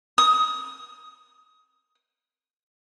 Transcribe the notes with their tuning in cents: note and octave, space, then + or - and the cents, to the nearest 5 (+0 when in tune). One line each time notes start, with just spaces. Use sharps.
D#6 +20